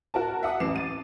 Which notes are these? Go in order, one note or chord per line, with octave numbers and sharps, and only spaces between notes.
F#4 A#4 A5
E5 F#5 D#6
A1 E3 D6 C7 E7
A6 D#7